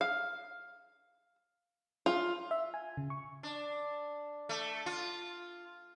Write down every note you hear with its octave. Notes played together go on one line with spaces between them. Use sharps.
F5
F4
E5
G#5
C#3
C#6
D4
A3
F4